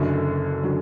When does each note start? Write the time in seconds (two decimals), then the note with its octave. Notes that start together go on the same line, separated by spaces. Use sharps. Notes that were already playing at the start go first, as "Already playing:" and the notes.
Already playing: F#1 F#2 D3 F#3
0.64 D3 F#3